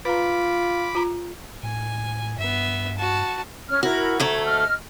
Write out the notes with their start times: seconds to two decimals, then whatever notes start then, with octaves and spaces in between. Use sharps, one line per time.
0.05 F4 B4 A#5 B5 D6
0.95 F4 A#5
1.63 A2 G#5
2.38 G2 B3 E5
2.98 F#4 A5
3.68 C#4 F6
3.83 E4 F#4 A#4
4.20 D2 A3 A4 A#5 G#6
4.46 D#5 F6